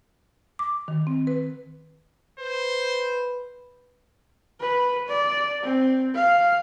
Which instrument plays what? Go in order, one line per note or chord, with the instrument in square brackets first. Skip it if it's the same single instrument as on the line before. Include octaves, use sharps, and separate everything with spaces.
[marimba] D6
D#3
C4
B4
[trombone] B4 [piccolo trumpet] C5
[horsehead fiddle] B4
D5
C4
F5